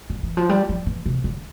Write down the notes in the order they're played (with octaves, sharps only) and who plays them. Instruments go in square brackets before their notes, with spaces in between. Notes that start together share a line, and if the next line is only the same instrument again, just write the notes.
[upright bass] D3
E3
F3
G3
F3
E3
C3
D3